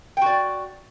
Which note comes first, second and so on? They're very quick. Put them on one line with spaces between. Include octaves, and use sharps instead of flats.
G5 F#4 D5